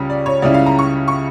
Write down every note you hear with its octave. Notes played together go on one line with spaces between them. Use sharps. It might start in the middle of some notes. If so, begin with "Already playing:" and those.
Already playing: C#2 C#3 G3 C#4
D5
C#5
C#2 C#3 G3 C#4 E4 D5
F5
A#5
C#6
C#6